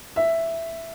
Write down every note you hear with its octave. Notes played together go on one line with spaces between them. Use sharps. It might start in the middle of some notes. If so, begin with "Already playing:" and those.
E5